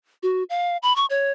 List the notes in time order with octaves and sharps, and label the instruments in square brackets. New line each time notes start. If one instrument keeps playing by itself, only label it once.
[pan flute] F#4
F5
B5
C#6
C#5